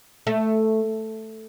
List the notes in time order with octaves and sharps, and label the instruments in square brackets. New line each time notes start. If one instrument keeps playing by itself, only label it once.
[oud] A3